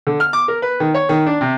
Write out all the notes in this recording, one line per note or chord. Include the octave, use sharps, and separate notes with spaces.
D3
F6
D6
A#4
B4
D#3
C#5
D#3
D4
C3